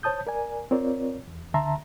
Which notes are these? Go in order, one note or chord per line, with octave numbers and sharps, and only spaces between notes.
C5 C#5 A5 D#6 G6
A#4 D5 G#5
C4 F4 A#4 C#5 D5
E2
D2 D3 E5 A5 A#5 C6